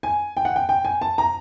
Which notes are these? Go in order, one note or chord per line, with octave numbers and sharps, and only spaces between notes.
G#5
G5
F#5
G5
G5
G#5
A5
A#5